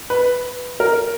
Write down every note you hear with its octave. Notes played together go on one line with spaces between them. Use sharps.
B4
A#4